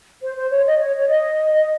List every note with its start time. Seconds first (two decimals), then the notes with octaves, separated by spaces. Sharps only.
0.22 C5
0.36 C5
0.51 C#5
0.65 D#5
0.80 C#5
0.96 C#5
1.08 D#5